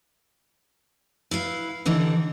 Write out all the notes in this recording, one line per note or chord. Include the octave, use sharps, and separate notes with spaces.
E4 B4 F5
D#2 D3 E3 D#4